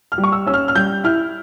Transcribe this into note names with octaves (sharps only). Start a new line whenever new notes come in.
F6
G3
C#6
E6
C#4 E6
F6
F6
G3 G6
E4 F6